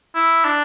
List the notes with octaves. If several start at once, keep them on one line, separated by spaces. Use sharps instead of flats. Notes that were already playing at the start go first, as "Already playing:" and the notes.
E4
D4